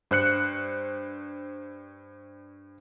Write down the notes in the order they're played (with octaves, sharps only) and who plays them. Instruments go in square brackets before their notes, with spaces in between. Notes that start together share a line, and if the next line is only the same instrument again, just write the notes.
[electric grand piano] G2 C5 F#6 C#7